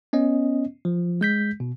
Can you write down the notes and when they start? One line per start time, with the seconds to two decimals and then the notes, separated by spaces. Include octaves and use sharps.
0.13 B3 C#4 D#5
0.85 F3
1.21 G#3 G6 B6
1.60 B2